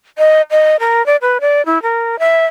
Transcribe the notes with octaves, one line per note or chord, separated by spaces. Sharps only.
D#5
D#5
A#4
D5
B4
D5
E4
A#4
E5